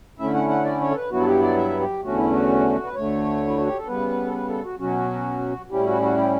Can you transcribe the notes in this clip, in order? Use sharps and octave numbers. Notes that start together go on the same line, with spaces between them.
D3 A3 C#4 E4 E5
F#5
F#5
D5
C#5
A4
B4
G2 F#3 B3 E4 F#4
A4
G4
D5
E5
G4
E2 D3 A3 C#4 F#4
E4
F#4
B4
D2 D3 A3 C#5
E4
F#4
G4
A4
C#3 G3 B3 B4
A4
B4
A4
F#4
B2 F#3 C#4 F#4
A2 G3 C#4 E4 G4
F#4
F#4
G4